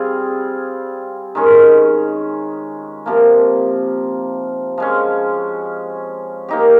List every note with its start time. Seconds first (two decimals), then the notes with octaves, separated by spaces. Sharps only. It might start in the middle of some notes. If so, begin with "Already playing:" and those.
Already playing: G3 C4 F4 G#4
1.35 D#3 G#3 C#4
3.06 C3 F3 A#3
4.78 F3 G#3 C#4
6.49 A#3 D#4 G4